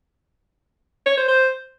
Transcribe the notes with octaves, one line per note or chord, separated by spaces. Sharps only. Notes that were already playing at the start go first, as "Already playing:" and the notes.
C#5
C5
C5